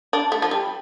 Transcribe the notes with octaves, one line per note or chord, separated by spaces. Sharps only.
D4
A3
F3
G3